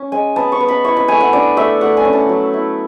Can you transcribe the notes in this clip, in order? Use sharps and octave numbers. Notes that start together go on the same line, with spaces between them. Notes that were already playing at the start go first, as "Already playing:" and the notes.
Already playing: C#4
G#3 G#5
B3 A5
C#6
B3
B5
E4 C#6
B5
A3 G#5
F#5
D4 D5
A3 E5
A3 F#5
G#5
C#4
A5
F#3
E4